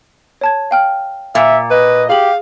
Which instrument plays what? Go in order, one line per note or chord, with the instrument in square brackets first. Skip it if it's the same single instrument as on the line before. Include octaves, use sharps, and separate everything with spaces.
[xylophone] C#5 A5 G#6
F5 G5 F6
[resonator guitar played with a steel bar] A#2 [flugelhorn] E5
[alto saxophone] B4 [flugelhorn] D#5
[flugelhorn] G4 [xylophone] G#4 F#7 [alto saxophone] F5